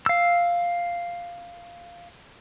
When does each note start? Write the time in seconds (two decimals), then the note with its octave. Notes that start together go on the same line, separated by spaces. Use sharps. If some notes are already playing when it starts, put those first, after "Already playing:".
0.06 F5 E6